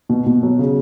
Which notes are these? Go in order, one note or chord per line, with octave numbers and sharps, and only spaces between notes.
B2
B2
F#3
C#3